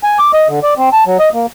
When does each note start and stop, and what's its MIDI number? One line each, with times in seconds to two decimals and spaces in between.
0.03 0.18 80
0.19 0.32 86
0.33 0.48 75
0.49 0.60 50
0.63 0.74 74
0.78 0.89 60
0.93 1.04 81
1.07 1.17 54
1.19 1.29 75
1.34 1.46 58